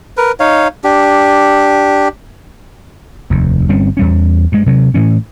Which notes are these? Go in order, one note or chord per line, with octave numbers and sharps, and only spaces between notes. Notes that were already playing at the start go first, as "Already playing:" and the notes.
A#4 B4
D#4 C#5 F5
D4 G4
F1 D#2
G1 G3 C4 C#4
E2 G3 C#4
G2 G#3
C3 F#3
A2 E3 C#4